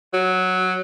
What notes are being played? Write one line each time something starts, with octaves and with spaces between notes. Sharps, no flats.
F#3